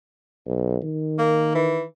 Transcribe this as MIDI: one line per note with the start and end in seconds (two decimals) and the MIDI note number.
0.47 0.78 35
0.83 1.87 51
1.19 1.54 58
1.55 1.82 52